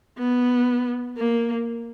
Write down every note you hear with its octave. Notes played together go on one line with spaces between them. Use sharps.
B3
A#3